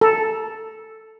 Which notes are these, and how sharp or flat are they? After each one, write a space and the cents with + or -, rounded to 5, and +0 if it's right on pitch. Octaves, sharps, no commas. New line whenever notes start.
A4 +0 A#5 +20